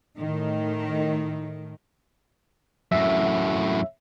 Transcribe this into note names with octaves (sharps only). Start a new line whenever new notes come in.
A2 D#3
F#2 A2 E5